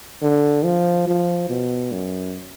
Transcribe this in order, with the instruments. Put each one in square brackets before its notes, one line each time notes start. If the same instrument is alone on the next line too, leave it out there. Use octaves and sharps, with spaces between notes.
[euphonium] D3
F3
F3
B2
F#2